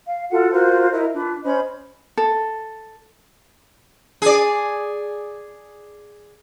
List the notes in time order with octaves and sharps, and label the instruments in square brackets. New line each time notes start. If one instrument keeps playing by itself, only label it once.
[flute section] F5
F4 F#4 A4 F#5
F4 F#4 A#4 C5
E4 A#4 D#5
D4 F4 B4
C#4 C5 D#5 B5
[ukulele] A4
[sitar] G#4 D5